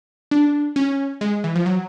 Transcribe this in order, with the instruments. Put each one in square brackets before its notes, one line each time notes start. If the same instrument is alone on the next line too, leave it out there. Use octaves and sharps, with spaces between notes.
[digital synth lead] D4
C#4
G#3
E3
F3
F#3